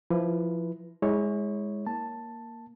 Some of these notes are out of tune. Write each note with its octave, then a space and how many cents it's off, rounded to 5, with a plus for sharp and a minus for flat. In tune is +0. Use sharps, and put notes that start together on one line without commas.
F3 -10 E4 +0 B4 -5
G#3 -5 E4 -35 C#5 +0
A#3 +0 A5 +5